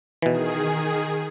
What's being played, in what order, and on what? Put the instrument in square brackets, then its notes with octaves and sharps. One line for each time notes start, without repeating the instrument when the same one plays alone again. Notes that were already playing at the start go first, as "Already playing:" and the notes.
[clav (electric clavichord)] B2 E3 [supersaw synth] D#3 G#4